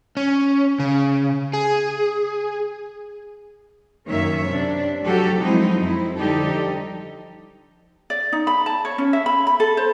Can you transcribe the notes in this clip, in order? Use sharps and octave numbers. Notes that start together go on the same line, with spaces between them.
C#4
C#3
G#4
F#2 D#3 A#3 C#5 E5
C3 D4
F3 F#3 A3 F#4 G4 A4
F3 F#3 G#3 C4 D#4 E4
F2 E4
D3 F3 G3 D#4 G4 A4
D5
D#4
B5
A5
C#5
C#4
E5
B5
B5
A4
C5